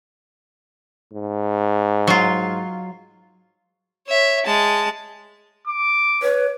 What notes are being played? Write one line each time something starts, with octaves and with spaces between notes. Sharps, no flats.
G#2
F#3 F4
C#5 E5
G#3 A5
D6
B4 C#5